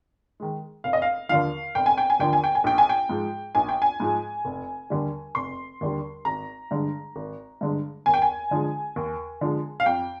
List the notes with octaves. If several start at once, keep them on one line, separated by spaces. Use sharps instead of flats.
D#3 G#3
F1 F5
D#5
F5
D#2 D3 F3 F5
F1 G5
G#5
G5
G#5
D#2 D3 F3 G5
G#5
G5
G#5
A#1 G5
G#5
G5
G#2 F3 G#3
A#1 G#5
G5
G#5
G#2 F3 G#3
F1
D#2 D3 G3
F1 C6
D#2 D3 G3
G#1 A#5
G2 D3 G#3
G#1
G2 D3 G#3
D#2 G#5
G5
G#5
D3 F3 G#3
D#2
D3 F3 G#3
F5
F2 G5